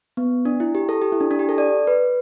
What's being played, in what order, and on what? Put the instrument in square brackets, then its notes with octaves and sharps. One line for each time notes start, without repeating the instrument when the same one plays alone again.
[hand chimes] B3
D4
E4
G4
A4
G4
E4
D4
D4
G4
A4
D5
B4